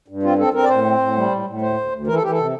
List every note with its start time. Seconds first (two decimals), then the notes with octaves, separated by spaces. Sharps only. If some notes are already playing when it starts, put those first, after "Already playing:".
0.08 G2
0.23 C4 F4
0.38 C4 A4
0.53 C4 A#4
0.64 D5
0.69 A2 C5
0.85 C4
0.99 A2
1.15 G3
1.30 A2
1.46 A2
1.61 D2 C5
1.77 D2
1.92 D2
2.07 E3 A#4
2.15 A4
2.22 E3 G4
2.31 A4
2.38 C3